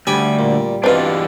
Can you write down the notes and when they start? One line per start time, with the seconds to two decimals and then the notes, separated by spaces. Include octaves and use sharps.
0.07 D2 G3 G#5 B5 D6
0.39 A#2
0.84 G2 B2 E3 C4 D4 F4 B4